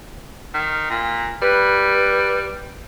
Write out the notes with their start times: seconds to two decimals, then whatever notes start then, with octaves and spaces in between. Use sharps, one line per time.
0.54 D#3
0.90 A#2
1.42 G3 B4